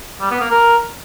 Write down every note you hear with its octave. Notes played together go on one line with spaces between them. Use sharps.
G3
B3
A#3
A#4